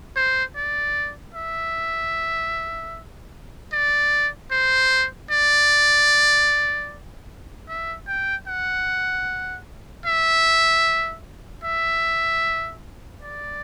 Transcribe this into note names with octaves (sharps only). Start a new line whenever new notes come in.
C5
D5
E5
D5
C5
D5
E5
G5
F#5
E5
E5
D5